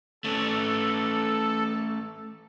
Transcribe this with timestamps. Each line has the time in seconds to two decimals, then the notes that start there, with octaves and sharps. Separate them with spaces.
0.24 A3 C#4 A4